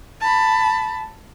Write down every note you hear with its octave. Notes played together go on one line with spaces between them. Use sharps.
A5 B5